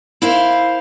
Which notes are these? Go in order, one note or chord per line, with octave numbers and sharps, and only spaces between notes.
E4 A#4 C5 F5